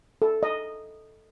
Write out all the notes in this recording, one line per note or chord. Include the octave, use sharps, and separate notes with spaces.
A4
D#5